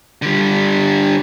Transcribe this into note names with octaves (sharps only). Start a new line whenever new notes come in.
D3 G3